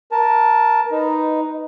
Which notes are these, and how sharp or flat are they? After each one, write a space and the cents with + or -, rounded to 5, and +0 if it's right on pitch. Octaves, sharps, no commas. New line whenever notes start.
A#4 +15 A5 +0
D#4 +0 B4 +0